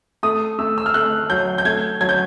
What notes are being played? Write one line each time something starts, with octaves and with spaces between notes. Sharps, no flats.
A3 D#6
A3 E6
E6
F6
A3 F#6
F#3 G6
G6
A3 G#6
F#3 G#6
G6